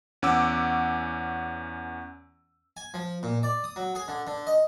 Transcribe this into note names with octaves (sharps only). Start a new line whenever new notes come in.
E2 C#4 F#5 D6 E6
G#5
F3
A#2
D5
D#6
F#3
G#4
D3
D3
D#5